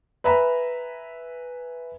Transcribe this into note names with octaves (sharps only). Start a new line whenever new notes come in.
B4 E5 G#5 A#5 B5